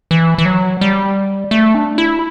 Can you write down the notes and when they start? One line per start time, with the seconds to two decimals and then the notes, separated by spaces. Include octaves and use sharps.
0.11 E3
0.38 E3
0.46 F#3
0.81 G3
1.51 A3
1.75 D4
1.98 E4